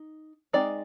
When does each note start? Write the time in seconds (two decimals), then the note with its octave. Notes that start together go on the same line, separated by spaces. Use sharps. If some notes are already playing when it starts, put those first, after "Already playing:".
Already playing: D#4
0.53 G#3 C4 D#4 D5